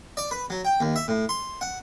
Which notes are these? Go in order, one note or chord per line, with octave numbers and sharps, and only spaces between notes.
D5
B4
F#3
G5
D#2
E5
A2
C6
F#5